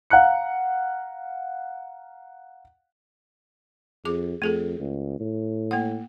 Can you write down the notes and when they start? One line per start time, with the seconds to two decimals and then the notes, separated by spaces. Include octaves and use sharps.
0.10 F5 F#5 A#5 F#6 C#7
4.05 F2 G#4 D6
4.42 F2 A3 G#4 A4
4.80 C#2
5.20 A2
5.71 A#3 F#5